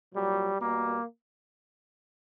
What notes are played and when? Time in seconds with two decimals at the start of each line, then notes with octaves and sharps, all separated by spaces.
0.14 A#2 F#3 G3
0.60 B2 G3 A#3